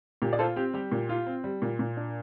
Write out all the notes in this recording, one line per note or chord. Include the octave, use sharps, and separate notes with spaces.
A#2 G4
D5
F4 A4 C5
C4 G4
G3 G4
A#2
F4
C4
G3
A#2
A#2
D4